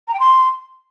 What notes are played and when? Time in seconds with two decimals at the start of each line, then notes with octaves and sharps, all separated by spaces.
0.08 A#5
0.14 G5
0.19 C6